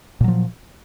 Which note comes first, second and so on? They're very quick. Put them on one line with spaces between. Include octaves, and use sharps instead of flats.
A#2 F#3 F3